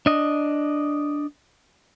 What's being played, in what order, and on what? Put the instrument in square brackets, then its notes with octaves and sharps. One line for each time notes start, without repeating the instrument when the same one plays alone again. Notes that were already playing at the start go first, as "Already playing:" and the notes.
[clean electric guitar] D4 D#5